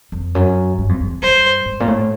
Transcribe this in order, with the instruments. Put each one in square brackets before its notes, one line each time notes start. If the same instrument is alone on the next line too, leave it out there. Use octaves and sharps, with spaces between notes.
[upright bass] F2
F#2
G2
F2
E2
[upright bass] G2 [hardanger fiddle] C5
[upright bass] G#2
A#2
A2